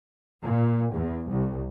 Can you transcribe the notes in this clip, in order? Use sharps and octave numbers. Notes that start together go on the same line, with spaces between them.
A#2
E2
C2